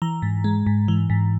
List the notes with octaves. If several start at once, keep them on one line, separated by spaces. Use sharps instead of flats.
E3 A#5
G#2
G#3
G#2
E3
G#2